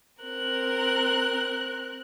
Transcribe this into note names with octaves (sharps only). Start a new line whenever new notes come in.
C4 A#4 F#6